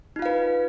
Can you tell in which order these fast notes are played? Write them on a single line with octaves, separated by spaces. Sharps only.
D#4 F4 F5 B4